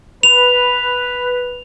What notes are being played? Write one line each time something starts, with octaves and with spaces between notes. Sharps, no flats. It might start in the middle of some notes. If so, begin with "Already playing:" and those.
B4 F7